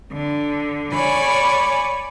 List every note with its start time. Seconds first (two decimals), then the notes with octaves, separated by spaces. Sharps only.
0.12 D3
0.93 C#5 D5 G#5 B5